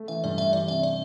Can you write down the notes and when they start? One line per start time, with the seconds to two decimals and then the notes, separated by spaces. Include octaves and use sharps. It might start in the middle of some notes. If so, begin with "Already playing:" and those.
Already playing: A3
0.08 E3 E5
0.24 G2 D5
0.38 D4 E5
0.53 E3 D5
0.68 C3 E5
0.83 D5